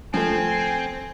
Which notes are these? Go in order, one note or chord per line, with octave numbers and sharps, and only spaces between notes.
F3 A3 C4 G#5